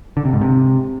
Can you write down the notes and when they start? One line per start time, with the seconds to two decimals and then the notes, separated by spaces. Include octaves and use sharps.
0.17 D3
0.25 C3
0.33 G#2
0.41 C3